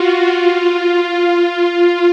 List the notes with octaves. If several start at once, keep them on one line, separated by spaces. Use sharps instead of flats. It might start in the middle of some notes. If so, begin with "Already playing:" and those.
Already playing: F4 F#4
F4
F4